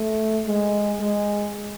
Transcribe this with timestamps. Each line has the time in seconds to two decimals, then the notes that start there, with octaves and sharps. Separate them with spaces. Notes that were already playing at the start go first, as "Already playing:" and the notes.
Already playing: A3
0.46 G#3
1.00 G#3